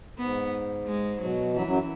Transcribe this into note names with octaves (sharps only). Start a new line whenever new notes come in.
G#2 B3
G#3
B2 F#3
F#2 E3 F#3
F#2 F#3